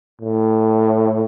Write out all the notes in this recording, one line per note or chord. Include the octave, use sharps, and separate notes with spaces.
A2